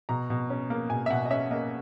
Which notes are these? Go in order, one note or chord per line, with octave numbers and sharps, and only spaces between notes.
B2 A#5
B2
C#4
A#3
B2 G#5
E5
B2 F#5
D#5
C#4 E5
A#3 D#5